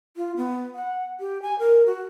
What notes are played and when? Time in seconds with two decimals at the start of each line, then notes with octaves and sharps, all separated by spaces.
0.16 F4
0.37 B3
0.75 F#5
1.20 G4
1.42 G#5
1.59 A#4
1.86 F#4